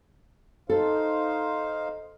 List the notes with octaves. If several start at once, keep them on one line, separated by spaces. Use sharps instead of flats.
D#4 A4 C5 F5